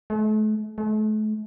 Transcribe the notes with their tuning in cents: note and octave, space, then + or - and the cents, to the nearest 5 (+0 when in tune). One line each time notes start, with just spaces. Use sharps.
A3 -40
A3 -40